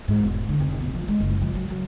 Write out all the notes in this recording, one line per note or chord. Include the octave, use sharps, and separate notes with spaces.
G#2
E1
D3
F1
B2
F3
G#3
F#1
F3
F#3
F#3